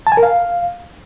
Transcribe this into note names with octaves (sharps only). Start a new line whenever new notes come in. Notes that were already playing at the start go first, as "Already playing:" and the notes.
A5
G#5
A#4
F5